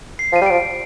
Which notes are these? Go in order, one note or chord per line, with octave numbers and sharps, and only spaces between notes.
C7
F3 D#7
G3
D7
F3